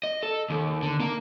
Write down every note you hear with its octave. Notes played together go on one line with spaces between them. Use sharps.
D#5
A4
D#2
D3
A#3